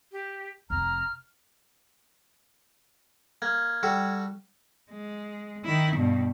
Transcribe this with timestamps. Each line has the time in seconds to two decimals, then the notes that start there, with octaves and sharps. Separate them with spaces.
0.12 G4
0.70 F1 F2 A#5 F6
3.42 A#3 F6 G#6
3.83 G3 F#4 A4
4.91 G#3
5.65 D#3 E4
5.96 G2 B2